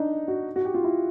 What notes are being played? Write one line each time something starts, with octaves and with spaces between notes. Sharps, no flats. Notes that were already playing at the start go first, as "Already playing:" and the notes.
Already playing: D4 D#4
F#4
F#4
G4
F4
E4